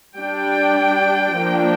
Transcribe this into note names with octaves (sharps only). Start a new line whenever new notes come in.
G3 D4 G5
F3 A#3 D4